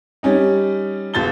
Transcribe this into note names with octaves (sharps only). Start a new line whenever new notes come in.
G3 C#4 D#4
E1 A6 G7